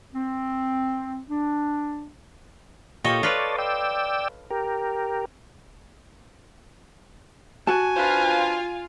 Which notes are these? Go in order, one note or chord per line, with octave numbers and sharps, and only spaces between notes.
C4
D4
A#2 F4 G4 A4 C#5 D#5
F4 B4 C#5 D5 A5
D5 G5 E6
G4 A#4
F#4 G#5 A5
D4 F4 B4 C5